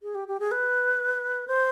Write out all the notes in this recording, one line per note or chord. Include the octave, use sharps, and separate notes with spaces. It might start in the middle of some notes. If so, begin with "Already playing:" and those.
G#4
G4
G4
G#4
B4
C5